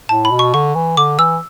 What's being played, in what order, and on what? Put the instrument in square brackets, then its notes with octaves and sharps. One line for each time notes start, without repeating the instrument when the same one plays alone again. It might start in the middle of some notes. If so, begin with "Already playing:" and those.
[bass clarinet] A2 [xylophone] A5
[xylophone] B5
[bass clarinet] B2
[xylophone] C#6
[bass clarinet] D3 [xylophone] C#6
[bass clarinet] E3
[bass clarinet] D3 [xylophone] D6
[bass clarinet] E3 [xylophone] E6